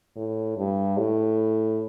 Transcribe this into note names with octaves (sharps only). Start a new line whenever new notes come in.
A2
G2
A2